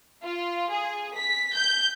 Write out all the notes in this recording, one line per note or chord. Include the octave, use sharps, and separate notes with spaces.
F4
G#4
B6
G6